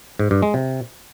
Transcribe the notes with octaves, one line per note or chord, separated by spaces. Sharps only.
G#2
G2
G#3
C3